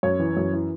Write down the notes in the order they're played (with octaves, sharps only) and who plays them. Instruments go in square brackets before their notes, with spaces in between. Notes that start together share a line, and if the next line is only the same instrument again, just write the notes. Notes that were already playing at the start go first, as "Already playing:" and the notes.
[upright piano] F#2 C#5
E3
F#2
E3